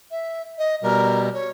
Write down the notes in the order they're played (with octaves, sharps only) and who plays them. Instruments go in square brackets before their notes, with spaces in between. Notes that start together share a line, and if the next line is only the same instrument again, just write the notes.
[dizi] E5
D#5
[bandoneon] B2 G3 [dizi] A#4
[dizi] C#5